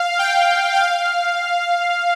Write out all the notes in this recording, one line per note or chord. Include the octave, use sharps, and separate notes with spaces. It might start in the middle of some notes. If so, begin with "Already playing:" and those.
Already playing: F5
G5
F5